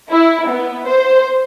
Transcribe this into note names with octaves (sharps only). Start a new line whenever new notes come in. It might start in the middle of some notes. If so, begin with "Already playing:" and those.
E4
B3
C5